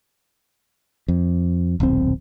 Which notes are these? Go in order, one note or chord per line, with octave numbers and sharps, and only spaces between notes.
F2
D#1 B1 C4